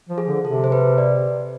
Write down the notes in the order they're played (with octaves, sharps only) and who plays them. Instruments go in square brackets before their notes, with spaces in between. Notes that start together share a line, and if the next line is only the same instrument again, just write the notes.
[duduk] F3
[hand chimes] G#4
[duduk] D3
[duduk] C3 [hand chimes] A4
[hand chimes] C5
B4
D5